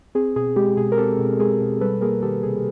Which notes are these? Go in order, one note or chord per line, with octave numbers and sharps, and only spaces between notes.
C4 G#4
B2 G#4
G#3 G4
B2 G#4
A#4
C4 G4 A4
B2
G#3 G#4 A#4
B2
G3 A4 B4
A#3 G#4 A#4
D#3 G4 A4
C3 G#4